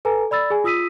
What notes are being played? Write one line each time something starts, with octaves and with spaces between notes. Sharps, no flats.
A4 B4 G#5 A#5
D5 B5 E6 A6
G#4 G#5
F4 D#6 E6 B6 D#7